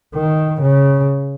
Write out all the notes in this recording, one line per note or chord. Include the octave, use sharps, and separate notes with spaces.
D#3
C#3